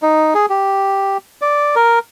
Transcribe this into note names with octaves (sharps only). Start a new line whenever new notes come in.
D#4
G#4
G4
D5
A#4